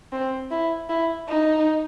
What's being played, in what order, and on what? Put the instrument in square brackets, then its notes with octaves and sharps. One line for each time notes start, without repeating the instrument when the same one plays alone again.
[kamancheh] C4
E4
E4
D#4